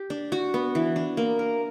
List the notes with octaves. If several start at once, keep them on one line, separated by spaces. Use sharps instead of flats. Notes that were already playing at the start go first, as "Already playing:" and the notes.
Already playing: G4
D4
F#4
B3
E3
D4
A#3
A#4